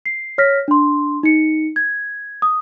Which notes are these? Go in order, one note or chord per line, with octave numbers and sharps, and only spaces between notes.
C7
C#5 F6 A#6 B6
D4 C6
D#4 C#7
G#6
D#6